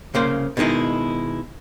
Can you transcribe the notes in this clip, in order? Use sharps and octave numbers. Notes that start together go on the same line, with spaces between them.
C2 C#3 A#3 C5
B2 D#3 G#3 D#4 E4